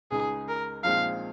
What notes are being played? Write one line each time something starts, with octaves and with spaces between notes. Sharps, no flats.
C#2 C#3 G#3 D#4 G#4
A#4
A#1 A#2 G#3 C4 D#4 F5